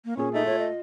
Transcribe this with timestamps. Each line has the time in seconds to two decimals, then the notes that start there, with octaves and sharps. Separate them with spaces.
0.05 A#3
0.17 A#2 C#4 G#4
0.34 A3 D#4
0.46 F4 C#5
0.59 D#5